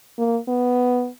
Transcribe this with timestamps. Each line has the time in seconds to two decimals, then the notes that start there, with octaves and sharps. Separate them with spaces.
0.18 A#3
0.48 B3